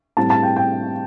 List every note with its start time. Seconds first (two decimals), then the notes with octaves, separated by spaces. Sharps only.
0.17 A2 G3 C4 A5
0.30 A5
0.43 G5
0.56 G5